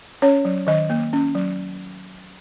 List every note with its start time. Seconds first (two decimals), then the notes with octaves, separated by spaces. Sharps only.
0.22 C#4 C#5
0.45 F#3
0.67 D#3 D#5
0.90 A#3
1.13 C#4
1.35 F#3